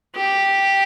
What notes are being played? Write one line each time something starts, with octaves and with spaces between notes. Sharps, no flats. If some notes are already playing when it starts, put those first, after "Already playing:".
G4